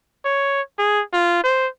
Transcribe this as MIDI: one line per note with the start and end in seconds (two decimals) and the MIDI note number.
0.25 0.61 73
0.79 1.02 68
1.13 1.43 65
1.44 1.67 72